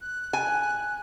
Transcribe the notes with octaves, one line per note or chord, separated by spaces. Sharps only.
F#6
G#5